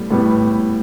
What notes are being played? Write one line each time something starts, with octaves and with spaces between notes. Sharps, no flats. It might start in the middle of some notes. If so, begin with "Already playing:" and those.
Already playing: A2 G3 B3
A2 G3 B3